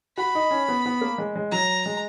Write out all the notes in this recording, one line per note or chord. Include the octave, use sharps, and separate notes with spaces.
F#4 B5
D#4
C#4
B3
B3
A#3
G#3
G#3
F#3 A#5
G#3